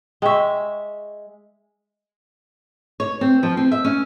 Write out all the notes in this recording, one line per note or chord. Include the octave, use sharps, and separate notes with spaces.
G#3 E5 G5 C#6
C#5
C4
F3
C4
E5
C#4